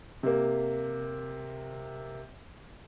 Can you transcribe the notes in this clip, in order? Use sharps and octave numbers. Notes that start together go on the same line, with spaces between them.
C3 A#3